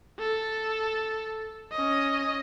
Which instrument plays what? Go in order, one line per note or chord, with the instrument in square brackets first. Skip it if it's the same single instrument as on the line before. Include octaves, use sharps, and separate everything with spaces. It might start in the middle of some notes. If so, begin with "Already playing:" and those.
[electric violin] A4
C#4 D#5